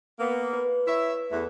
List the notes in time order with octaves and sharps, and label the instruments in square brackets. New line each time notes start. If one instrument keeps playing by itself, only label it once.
[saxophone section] A#3 B3
[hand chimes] B4
[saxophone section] E4 C#5 E5
E2 A3